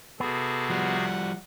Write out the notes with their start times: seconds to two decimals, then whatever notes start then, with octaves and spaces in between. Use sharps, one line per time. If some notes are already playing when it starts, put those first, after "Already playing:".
0.20 C3 B3 F#4 G#4 A4
0.70 F3 G3 F#5